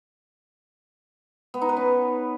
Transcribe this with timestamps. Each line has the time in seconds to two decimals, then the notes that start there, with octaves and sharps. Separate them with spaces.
1.54 B3
1.62 D#4
1.69 B4
1.77 C#4